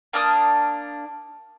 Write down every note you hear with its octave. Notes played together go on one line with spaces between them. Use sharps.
A#3 D4 D#6 F6